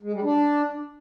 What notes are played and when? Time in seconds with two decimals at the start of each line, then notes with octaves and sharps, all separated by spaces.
0.03 G#3
0.13 G3
0.24 D4